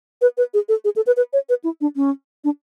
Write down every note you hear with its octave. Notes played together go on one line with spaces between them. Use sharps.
B4
B4
G#4
A4
G#4
A4
B4
B4
C#5
B4
E4
D4
C#4
D4